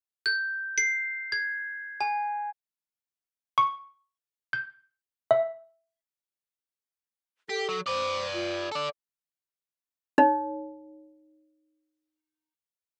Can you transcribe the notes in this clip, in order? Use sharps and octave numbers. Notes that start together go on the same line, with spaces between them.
G6
C7
G#6
G#5
C#6
G6
E5
G4 A4
F#3
B4 C5 D5
F4
A4 D5
D#4 C#5